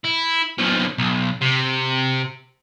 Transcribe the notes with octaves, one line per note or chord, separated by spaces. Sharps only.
E4
B1 F3
B1
C3